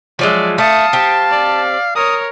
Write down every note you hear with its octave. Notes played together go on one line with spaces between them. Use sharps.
F3 F#3 G#3 D5 E5
A3 F5 A5 D#6 C#7
C4 G4
D5
A#4 C#5 D#6